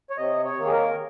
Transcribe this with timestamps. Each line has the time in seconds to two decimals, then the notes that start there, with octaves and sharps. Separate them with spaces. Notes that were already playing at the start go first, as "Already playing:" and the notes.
0.10 C#5
0.17 C3 D#5
0.44 C#5
0.58 D#3 A#3
0.66 G#4
0.72 A#4